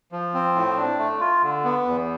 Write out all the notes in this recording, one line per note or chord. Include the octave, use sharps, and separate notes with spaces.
F3
C4
A2
D4
A3
F4
D3
B3
E2